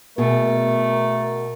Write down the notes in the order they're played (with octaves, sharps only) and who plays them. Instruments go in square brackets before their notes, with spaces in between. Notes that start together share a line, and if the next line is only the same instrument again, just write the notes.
[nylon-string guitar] B2 G#4 [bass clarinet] A3 [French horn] A#4